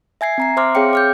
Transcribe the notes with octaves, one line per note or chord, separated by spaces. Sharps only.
E5 G#5 G#6 C7
C4 A#5 C7
C5 E5 C6 D6 F6
C4 G#4 C#5 F5 G5 C#7
D6 F6 G6